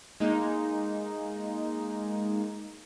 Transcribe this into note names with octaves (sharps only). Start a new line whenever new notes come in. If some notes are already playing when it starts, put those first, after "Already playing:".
G#3 A#3 D#4